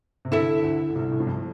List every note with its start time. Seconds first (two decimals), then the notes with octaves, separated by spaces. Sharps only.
0.25 C3
0.31 D2 D3 E4 A4 E5
0.63 D2 D3
0.90 D3
0.96 C2 C3
1.11 A2
1.20 G2
1.27 F2